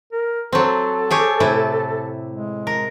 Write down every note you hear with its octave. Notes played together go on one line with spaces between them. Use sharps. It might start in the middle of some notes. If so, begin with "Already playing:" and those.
A#4
F#3 C4 A4
G4 G#4 C#5
A2 C3 E4
G#3
A#4